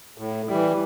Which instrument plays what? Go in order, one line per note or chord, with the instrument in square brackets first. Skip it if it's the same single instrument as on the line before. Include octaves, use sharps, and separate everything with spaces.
[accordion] A2
[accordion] E3 G3 [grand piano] E4